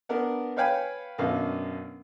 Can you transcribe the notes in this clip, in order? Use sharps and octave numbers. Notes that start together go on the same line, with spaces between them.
B3 D4 A#4
B4 C#5 F5 G5 G#5 B5
F#2 B2 D#3 D4 F5